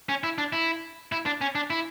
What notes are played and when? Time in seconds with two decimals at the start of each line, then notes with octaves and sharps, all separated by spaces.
0.09 C#4
0.24 E4
0.38 D4
0.53 E4
1.12 E4
1.26 D4
1.41 C#4
1.55 D4
1.70 E4